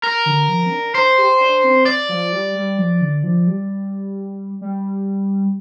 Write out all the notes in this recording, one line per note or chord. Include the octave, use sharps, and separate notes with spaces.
A#4
D3
F3
C4
D4
C5
G4
D4
C4
D5
F3
G3
G3
F3
D3
F3
G3
G3